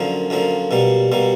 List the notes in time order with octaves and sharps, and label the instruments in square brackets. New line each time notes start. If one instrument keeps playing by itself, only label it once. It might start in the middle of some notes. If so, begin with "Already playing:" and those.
Already playing: [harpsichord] F#2 D3 F3 A#3
F#2 D3 F3 A#3
B2 G3 A#3
B2 G3 A#3